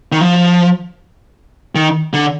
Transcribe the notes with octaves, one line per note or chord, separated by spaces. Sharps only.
D#3
F3
D#3
D3